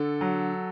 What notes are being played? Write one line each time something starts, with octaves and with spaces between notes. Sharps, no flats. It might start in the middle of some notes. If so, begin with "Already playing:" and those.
Already playing: D3 A4
F#3